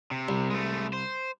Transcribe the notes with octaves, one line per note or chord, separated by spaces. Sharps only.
C3
C2
G#3 A3
C5